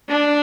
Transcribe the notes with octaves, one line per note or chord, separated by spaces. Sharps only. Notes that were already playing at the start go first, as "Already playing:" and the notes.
D4